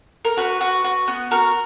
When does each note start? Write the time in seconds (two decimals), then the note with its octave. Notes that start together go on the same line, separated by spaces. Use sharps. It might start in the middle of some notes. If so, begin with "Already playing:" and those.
0.25 A#4
0.37 F#4 B4
0.61 F#4
0.84 F#4
1.08 B3
1.31 F#4 A#4